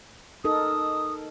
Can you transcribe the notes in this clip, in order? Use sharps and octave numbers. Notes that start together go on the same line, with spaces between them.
D#4 A4 A#4 D#6